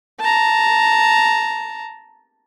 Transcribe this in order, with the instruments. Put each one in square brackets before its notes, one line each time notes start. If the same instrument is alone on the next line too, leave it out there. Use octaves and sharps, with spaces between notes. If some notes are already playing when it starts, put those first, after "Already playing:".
[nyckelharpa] A5 A#5